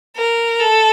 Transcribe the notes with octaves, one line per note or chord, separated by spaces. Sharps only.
A#4
A4